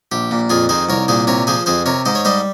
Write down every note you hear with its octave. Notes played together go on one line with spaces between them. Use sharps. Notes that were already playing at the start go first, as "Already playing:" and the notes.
A#1 G4
A#2
F2 F4 G#4
D#3 G#4 C5
C2 A#4 C#5
A#2 G#4 C5
C3 A#4 C#5
F3 G#4 C5
F2 G#4 C5
C3 A#4 C#5
G#2 C5 D#5
C#5
G3 C5 D#5